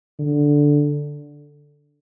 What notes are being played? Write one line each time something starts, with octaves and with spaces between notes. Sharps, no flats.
D3